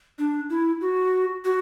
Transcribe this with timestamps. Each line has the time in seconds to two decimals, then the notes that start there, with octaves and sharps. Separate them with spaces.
0.19 D4
0.50 E4
0.81 F#4
1.45 F#4